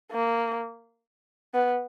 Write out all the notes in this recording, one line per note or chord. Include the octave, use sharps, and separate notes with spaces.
A#3
B3